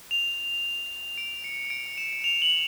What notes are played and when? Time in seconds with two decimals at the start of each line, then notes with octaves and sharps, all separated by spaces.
0.11 F7
1.18 D7
1.44 C#7
1.70 D7
1.98 E7
2.24 F7
2.42 F#7